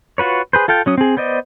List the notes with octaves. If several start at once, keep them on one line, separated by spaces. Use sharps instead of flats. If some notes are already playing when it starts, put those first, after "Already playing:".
F4 F#4 B4 C#5
G#4 B4 C5
F4 A4 F5 G5
F#3 C#4 D#6
C4 G#4
B3 C5 D5 D#5